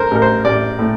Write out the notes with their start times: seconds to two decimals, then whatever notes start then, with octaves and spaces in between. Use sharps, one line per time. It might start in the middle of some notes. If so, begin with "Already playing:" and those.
Already playing: A3 A#4 C5
0.11 A1 A#4
0.22 C5
0.45 A1 D5
0.79 A2